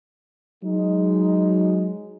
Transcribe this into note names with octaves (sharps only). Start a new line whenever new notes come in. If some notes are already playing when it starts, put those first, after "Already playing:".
F#3 G#3 D#4